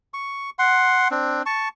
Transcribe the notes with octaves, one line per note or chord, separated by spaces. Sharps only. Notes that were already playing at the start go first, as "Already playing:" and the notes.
C#6
F#5 C6
C4 D4
A5 C#6